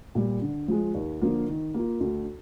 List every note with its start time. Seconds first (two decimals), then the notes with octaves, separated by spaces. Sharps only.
0.15 A#2 G3
0.42 D3
0.68 F3 G#3
0.94 D#2
1.21 D3 F3 A#3 F4
1.48 D#3
1.74 A#3 F4
2.01 D2